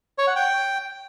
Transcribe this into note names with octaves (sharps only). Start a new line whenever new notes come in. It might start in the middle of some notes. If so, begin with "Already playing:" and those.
C#5
F#5
G5